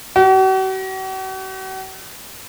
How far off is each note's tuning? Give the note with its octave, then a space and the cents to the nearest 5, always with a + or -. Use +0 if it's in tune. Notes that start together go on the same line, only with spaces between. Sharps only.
F#4 +45